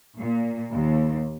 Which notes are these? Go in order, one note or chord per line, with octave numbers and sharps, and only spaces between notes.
A#2
D#2